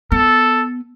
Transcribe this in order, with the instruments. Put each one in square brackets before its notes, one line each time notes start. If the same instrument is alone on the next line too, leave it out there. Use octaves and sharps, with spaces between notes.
[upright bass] B3 [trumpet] A4